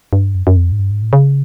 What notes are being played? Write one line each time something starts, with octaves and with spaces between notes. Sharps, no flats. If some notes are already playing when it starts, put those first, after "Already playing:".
G2
F#2
F#2
F2
G#2
G2
G#2
A2
C#3